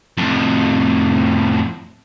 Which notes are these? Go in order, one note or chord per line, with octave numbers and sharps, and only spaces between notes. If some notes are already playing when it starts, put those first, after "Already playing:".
F2 A2